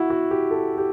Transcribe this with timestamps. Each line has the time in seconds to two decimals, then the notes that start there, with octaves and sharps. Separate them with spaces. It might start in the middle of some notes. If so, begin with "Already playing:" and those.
Already playing: E4 F#4
0.10 F#4
0.31 G4
0.51 A4
0.78 G4